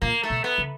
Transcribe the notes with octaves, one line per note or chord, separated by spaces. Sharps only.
A#2 A#3
A3
B2
B3
C#3